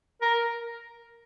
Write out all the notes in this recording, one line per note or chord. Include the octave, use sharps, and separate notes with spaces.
A#4